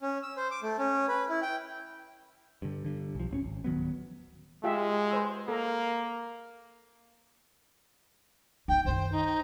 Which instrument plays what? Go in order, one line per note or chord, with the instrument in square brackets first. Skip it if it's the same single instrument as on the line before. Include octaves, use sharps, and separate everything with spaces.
[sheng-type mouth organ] C#4
E6
C5
D6
A3
C#4
B4
E4
G5
[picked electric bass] G2 D3
G2 D3
B1 F3
D1 C4 C#4
G#1
D1 D#3 F#3 B3
[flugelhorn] G#3 [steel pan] F4 G4 E5
[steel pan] B4 C5 E6
[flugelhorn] A#3 [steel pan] A4 A#5
[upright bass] D#4 E4 [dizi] G5
[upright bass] F#2 D#3 [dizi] C5
[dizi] D#4